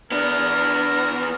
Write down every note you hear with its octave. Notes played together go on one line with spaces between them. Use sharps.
E2 B3 D4 A#4